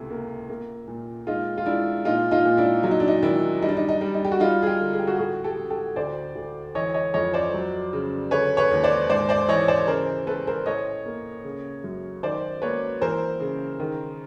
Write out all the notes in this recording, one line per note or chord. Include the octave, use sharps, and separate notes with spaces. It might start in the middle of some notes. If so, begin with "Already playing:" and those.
Already playing: C#2 A2 C3
A#3
A#3
A#2
G#3 D#4 F4
F4
G#3 D4 E4
A#2 D#4 F4
D#4 F4
A#2
D4 E4
F#3 E4
D#4
D4
D#4
D#3 D4 E4
G3 D#4
D4
D#4
D#4
G3
D#4
G4
F#4
G3 D#4 F4
G#4
F4 G4
D3
G#4
G4
F#4 G#4
A2 F#4 G#4
G4 A4
A2
G4 A4
D2 C5 D5
D2
E3 C#5 D#5
C#5 D#5
F2 C#5 D#5
C5 D5
F#3
C#3
D3 B4 C#5
B4 C#5
D#2
C5 D5
G#2 C5 D5
C5 D5
E3 C#5 D#5
C5 D5
C#3 A#4 C5
A3 A4 B4
A#4 C5
A2 C#5 D#5
A#3
C#3
F#2
D#3 C5 D5
A#3 B4 C#5
E3 A#4 C5
C#3
D#3